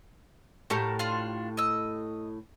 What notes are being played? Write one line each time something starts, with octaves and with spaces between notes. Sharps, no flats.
A2 F#4 G4 A4 A#4
D4 F4 F5
D#5 E6